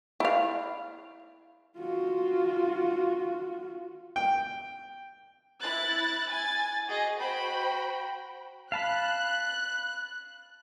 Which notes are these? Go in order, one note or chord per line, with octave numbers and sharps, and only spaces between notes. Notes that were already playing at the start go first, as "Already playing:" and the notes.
E4 F5
F4 F#4
G5
E4 F#6 A6
G#5 A6
F#4 G#4 D#5
F#4 C5 G5 B5
F5 A5 B5 F#6